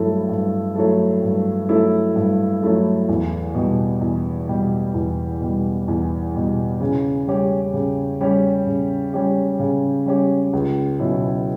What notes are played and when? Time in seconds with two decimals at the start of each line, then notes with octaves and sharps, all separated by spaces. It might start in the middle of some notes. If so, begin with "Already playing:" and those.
Already playing: G2 F#3 A3 E4 A4
0.29 G2
0.75 F#3 A3 E4 A4
1.22 G2
1.69 F#3 A3 E4 A4
2.16 G2
2.62 F#3 A3 E4 A4
3.09 E2
3.55 B2 G3
4.01 E2
4.48 B2 G3
4.94 E2
5.41 B2 G3
5.88 E2
6.34 B2 G3
6.81 C#3
7.27 G3 C#4 G4
7.74 C#3
8.21 G3 C#4 G4
8.66 C#3
9.13 G3 C#4 G4
9.59 C#3
10.06 G3 C#4 G4
10.53 C#2
10.99 B2 F#3 C#4 E4